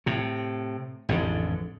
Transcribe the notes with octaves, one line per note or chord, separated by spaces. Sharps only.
A2 C3
A1 F2 G#2 D3